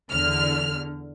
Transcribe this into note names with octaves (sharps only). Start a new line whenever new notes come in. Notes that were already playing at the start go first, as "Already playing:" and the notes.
E2 D3 F6